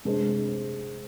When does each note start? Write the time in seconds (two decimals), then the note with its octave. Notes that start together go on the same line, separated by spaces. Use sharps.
0.05 C3 G#3 D4 G#4 C5